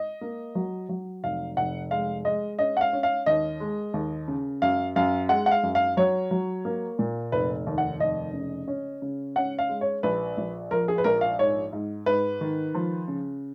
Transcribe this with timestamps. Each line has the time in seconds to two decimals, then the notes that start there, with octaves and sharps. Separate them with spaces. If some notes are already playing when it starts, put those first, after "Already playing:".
Already playing: D#5
0.21 A#3
0.55 F#3
0.89 F#3
1.23 F1 F5
1.57 F1 F#5
1.91 G#3 F5
2.25 G#3 D#5
2.59 C#4 D#5
2.77 F#5
2.81 F5
2.93 C#4
3.03 F5
3.26 D#2 D#5
3.60 G#3
3.94 D#2
4.28 C#3
4.62 F#2 F5
4.96 F#2 F5
5.29 G#3 F#5
5.46 F#5
5.51 F5
5.63 F#2
5.75 F5
5.97 F#3 C#5
6.31 F#3
6.65 A#3
6.99 A#2
7.32 F1 B4
7.66 D#2
7.78 F#5
8.00 F1 D#5
8.33 C#3
8.68 C#4
9.02 C#3
9.36 C#4 F#5
9.59 F5
9.69 G#3
9.81 C#5
10.03 A#1 B4
10.37 A#1
10.71 F3 A#4
10.88 G#4
10.98 B4
11.04 A#1 A#4
11.21 F5
11.39 G#2 C#5
11.73 G#2
12.06 G#2 B4
12.41 D#3
12.75 F3
13.08 C#3